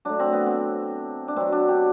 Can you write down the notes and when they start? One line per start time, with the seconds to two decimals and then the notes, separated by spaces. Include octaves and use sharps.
0.05 A2 F#3 D4
0.19 C4
0.32 B3
0.46 C4
1.28 D4
1.36 B2 F#3 C4
1.52 D4
1.69 G4